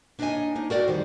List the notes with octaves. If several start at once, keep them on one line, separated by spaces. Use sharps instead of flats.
A#3 D4 D#4 C#5 D#5 G#5
A#3 D4 D#4
F#4 A#4 D5 G5
F2 D#3 G3 C5